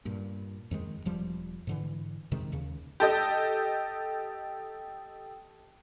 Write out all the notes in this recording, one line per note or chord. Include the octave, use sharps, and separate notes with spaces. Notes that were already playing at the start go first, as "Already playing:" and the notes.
G2 A#2
F2 D#3 G#3
E1 F3 G3
G#2 D3 E3
F2 C3 D#3 G#3
D#2 C#3
G4 A4 D#5